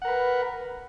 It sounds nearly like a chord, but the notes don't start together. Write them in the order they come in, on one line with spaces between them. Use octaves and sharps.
F#5 A#4 B4